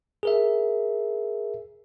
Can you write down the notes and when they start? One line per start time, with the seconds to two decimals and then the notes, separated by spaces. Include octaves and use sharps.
0.23 G#4 A#4 E5